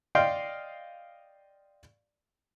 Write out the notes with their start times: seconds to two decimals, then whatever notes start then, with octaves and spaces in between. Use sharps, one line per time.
0.15 D5 D#5 F5 G5 C6